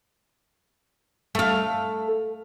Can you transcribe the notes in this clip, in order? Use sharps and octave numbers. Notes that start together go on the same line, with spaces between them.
A3 F5